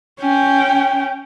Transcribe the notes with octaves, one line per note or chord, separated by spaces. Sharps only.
C#4 G5